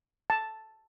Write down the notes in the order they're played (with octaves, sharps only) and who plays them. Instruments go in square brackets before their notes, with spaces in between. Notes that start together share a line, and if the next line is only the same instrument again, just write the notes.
[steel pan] A5